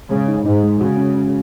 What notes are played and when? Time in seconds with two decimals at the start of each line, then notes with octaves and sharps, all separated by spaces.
0.11 C#3 G#3
0.28 D#4
0.45 G#2 D#4
0.63 G#3
0.81 C#3 F#4
0.98 C#4
1.15 C#4